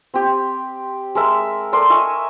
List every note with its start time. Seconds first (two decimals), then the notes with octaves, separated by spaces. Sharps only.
0.14 C4 G4
1.15 G#3 A#4 E5 A5
1.72 A4 A#4 D5 C6
1.90 D#5 E5 G#5 C#6